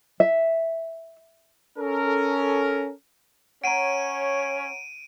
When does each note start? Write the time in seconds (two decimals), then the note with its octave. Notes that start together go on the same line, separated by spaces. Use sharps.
0.20 E5
1.78 C#4 A4 A#4
3.64 C#4 C#5 F#5 A#5 D7 D#7